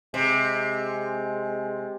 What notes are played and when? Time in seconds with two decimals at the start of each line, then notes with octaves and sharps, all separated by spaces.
0.14 C3 G#3